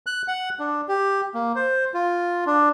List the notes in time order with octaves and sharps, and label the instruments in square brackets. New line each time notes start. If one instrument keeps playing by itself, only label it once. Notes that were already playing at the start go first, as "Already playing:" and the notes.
[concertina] F#6
F#5
D4
G4
A#3
C5
F4
D4